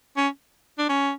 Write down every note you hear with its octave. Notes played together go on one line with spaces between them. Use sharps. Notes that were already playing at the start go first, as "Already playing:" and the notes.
C#4
D4
C#4